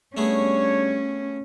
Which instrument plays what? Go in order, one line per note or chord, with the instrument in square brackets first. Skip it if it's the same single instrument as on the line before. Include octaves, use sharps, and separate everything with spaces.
[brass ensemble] G3 D4 C#5 [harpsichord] A3 B3 G#4 [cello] C#4